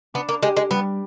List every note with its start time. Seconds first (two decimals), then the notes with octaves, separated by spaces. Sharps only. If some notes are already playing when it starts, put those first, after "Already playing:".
0.14 B3 D4
0.29 A#3
0.43 G#3 G4
0.57 G#3
0.70 G3 B3